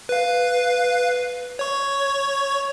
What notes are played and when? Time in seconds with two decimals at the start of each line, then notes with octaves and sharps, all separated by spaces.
0.09 B4 F5
1.59 C#5 C#6